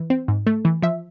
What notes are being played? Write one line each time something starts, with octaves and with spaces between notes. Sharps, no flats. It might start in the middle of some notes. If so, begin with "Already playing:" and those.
Already playing: E3
C4
G#2
A3
E3
F3 E5